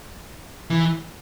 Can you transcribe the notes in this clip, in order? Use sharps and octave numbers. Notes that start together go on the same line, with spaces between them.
E3